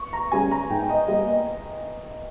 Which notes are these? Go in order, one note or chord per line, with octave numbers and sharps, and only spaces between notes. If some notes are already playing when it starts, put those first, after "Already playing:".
Already playing: C#6
A#5
G3 C#4 G#4 G#5
A#5
G#2 G5
D#5
G3 A#3 D#5
D#5